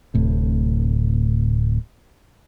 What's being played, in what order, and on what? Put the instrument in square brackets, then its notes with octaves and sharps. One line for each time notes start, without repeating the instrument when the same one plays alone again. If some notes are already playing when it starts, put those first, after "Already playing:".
[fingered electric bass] D1 A2 C3